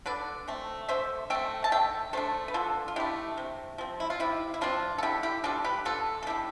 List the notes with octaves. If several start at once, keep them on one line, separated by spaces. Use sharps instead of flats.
D3 B4 D5
A3 C4
D3 C5 E5
A3 C4 E5 G5
A5
D3 E5 G5
A3 D4 A4 C5
B4
D3 F4 A4
F4
A3 D4 E4 G4
C3
F3 C4
E4
F4
C3 E4 G4
E4
F3 C4 D4 F4
A4
D3 E4 G4
E4 G4
G3 D4 F4 A4
G4 B4
D3 F4 A4
A4
G3 D4 E4 G4